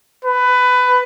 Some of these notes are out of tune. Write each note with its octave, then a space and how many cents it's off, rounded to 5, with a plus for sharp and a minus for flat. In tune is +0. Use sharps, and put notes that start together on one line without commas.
B4 +15